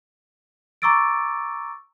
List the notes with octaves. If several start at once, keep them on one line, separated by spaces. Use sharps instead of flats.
A#5 C#6 D6 E6 A6 D7